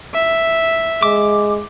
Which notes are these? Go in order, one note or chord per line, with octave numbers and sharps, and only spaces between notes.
E5
G#3 D6